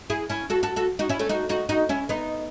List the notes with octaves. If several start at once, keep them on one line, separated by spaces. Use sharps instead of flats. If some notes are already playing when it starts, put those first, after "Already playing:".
E4 G#4
C#4 E4
F#4 A4
F#4 A4
F#4 A4
D#4 F#4
C#4 E4
A3 C#4
D#4 F#4
D#4 F#4
D#4 F#4
C#4 E4
B3 D#4